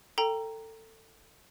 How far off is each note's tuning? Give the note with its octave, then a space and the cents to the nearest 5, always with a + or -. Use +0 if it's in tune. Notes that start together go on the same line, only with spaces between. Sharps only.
A4 +20 G5 +0 A#5 +0